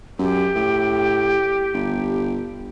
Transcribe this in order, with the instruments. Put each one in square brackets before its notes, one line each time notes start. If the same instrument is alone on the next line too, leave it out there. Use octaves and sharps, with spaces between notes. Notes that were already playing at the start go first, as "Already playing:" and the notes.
[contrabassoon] F#2 [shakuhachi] G4
[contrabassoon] A2
G1